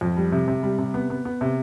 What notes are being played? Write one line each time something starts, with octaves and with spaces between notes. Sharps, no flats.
F2
G3
C3
C3
G3
C3
B3
B3
B3
C3